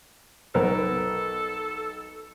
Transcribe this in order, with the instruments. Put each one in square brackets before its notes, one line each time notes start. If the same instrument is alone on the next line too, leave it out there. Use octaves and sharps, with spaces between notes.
[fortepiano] B1 B3 A#4 [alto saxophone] A4